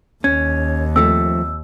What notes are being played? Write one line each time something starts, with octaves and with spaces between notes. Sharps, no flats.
D#2 C#4 G#6
F3 A3 C4 E6